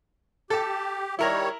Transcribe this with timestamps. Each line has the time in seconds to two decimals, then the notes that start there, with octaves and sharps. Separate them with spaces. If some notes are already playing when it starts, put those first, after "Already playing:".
0.50 G4 A4 A5
1.19 D#3 G3 E4 A#4 C#5 A#5